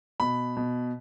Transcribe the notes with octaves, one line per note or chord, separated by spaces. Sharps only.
B2 B5
B2